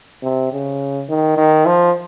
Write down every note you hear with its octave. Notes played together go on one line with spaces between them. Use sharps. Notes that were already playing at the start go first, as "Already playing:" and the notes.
C3
C#3
D#3
D#3
F3